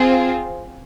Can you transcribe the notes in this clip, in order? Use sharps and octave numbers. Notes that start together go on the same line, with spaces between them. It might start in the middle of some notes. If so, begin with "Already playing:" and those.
Already playing: C4 F4 G#4